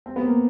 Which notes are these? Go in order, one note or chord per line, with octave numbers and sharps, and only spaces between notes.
C4
B3
A#3